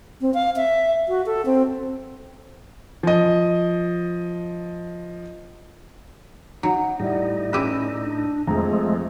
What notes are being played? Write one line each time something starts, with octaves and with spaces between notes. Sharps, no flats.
C4
F5
E5
F#4
A4
C4
F3 D#5
F#3 D#4 F#5
A2 G3 D#4 E4 D5
C#4 G4 B4 E6 D#7
D4
F2 F3 G#3 A3 G#4 A#5